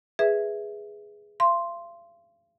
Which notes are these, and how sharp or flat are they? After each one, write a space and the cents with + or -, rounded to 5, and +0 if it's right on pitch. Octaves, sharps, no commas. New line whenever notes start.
G#4 +0 B4 +0 E5 +0
F5 -40 C6 +0